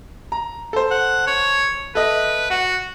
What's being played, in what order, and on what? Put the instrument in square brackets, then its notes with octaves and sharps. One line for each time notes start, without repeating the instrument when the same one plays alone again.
[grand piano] A#5
A4 C5
[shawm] F#5
C#5
[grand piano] A4 D#5 E5 [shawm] B4
[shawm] F#4 [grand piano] F#5